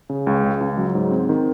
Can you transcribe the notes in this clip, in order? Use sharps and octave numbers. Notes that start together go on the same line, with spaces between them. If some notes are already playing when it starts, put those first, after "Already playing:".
C#3
C#2
C#3
C#2
F#3
G#2
C4
D#3